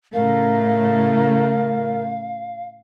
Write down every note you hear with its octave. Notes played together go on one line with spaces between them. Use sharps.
A2 C#3 A3 A#4 F5